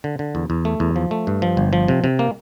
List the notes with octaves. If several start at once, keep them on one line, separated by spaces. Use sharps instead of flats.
D3
D3
E2
E2
A3
E2
F3
A3
G2
F3
G1
F3
C3
C3
A#3